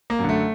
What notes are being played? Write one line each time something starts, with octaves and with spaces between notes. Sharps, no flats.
A#3
F#2 D3
A3